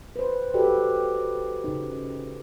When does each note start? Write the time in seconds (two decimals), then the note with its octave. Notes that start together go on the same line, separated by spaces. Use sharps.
0.16 B4 C5
0.54 F#4 G4 A4 B4 D5
1.64 C#3 D#4